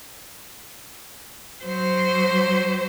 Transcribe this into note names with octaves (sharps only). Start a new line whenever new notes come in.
F#3 C5